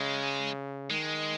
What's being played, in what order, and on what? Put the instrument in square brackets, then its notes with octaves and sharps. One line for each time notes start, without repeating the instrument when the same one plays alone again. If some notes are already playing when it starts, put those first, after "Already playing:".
Already playing: [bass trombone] C#3 [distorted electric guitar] G#3
[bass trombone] D#3 [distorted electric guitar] G#3